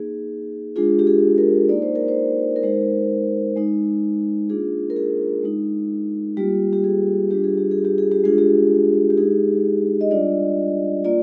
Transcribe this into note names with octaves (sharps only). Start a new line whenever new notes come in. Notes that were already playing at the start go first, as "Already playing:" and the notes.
Already playing: A#3 D#4 G#4
G#3 D4 F4 G#4
G4
G#4
A#4
A#3 D#4 D5
C5
A#4
C5
A#4
G#3 D#4 C5
G#3 D#4
A#3 D4 F4 G#4
A#4
G#4
G#3 D#4
G3 A#3 F4 G4
G4
G#4
G3 D4 F4 G4
G#4
G4
G#4
G4
G#4
G4
G#3 D4 F4 G#4
G4
G4
G#3 D#4 G#4
D#5
G3 D4 F4 D5
A#3 F4 D5